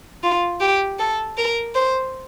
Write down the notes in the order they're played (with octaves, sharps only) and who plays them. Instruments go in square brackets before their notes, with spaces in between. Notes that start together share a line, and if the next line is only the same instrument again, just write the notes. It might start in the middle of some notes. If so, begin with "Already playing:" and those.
[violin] F4
G4
A4
A#4
C5